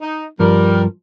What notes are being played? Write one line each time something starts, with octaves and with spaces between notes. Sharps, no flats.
D#4
G2 F3 G3 A#4